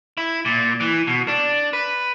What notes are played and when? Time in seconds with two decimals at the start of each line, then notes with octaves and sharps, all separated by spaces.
0.18 E4
0.45 A#2
0.80 E3
1.07 B2
1.28 D4
1.73 B4